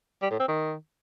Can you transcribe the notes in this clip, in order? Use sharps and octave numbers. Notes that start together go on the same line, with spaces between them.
G3
A2
C4
D#3